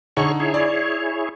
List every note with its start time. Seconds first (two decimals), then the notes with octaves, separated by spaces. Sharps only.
0.17 D3 D#4 G#4 C#5 C#6
0.40 E4 G#4 C#5
0.54 D5